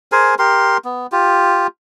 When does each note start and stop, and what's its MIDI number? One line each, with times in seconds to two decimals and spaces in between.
0.12 0.35 68
0.12 0.35 70
0.12 0.35 72
0.12 0.35 80
0.39 0.77 67
0.39 0.77 70
0.39 0.77 84
0.85 1.07 59
1.12 1.67 65
1.12 1.67 67